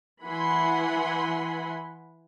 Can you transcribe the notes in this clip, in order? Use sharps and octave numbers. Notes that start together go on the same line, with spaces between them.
E3 F#5 G#5 B5 C6